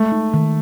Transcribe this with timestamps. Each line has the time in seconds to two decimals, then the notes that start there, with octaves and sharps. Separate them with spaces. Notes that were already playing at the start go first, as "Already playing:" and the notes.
Already playing: G#3 A3
0.12 D#4
0.34 D#3